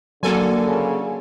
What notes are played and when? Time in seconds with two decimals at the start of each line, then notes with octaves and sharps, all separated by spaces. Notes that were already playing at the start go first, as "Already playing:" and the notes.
0.23 D3 F#3 A#3 A4 G#5
0.65 C#3